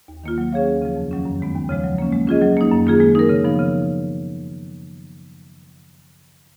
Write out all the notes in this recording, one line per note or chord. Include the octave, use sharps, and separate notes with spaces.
D#2
D#3 A#3 F4
F#3
C#4 G#4 C#5 F5
D#2
C#3 F3
F2
D#3 F#3 C#4
F#2
D#3 G#3 B3
D#2
C#3 F3 G#3
F#3
A#3 C#4
G#3
C#4 F4 G#4 D#5
F#3
A#3 D#4
F#2
D#3 A#3 F4 G#4
G#3
D#4 A#4
C#3
F3 B3 D#4
C#3